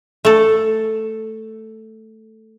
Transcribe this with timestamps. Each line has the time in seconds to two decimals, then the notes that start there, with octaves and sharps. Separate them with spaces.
0.25 A3 A4